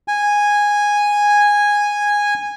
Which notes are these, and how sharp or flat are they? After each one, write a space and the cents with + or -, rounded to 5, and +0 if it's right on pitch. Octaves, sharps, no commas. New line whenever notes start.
G#5 -10